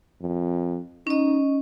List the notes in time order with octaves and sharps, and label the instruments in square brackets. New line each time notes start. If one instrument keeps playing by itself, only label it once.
[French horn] F2
[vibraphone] C#4 D#5 [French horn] D#4